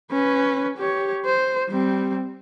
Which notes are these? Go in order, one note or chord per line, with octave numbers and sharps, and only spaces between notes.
C#4 B4
G4 C#5
C5
G3 C4